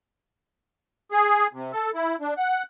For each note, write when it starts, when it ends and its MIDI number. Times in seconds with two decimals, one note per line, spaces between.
1.12 1.47 68
1.53 1.72 48
1.72 1.91 69
1.95 2.16 64
2.21 2.34 62
2.38 2.63 78